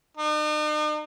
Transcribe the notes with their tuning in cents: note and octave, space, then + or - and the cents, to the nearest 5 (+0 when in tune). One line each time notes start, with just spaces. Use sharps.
D#4 -45